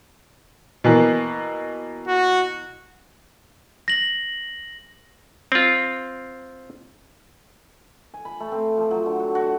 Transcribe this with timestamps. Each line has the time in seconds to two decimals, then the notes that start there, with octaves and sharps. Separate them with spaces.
0.84 B2 E3 A#3
2.08 F#4
3.88 A#6 F#7
5.52 C4 F4
8.14 G#5
8.25 B5
8.40 A3
8.52 C4
8.77 F3
8.91 F#3
9.06 D3
9.20 F#4
9.35 F#4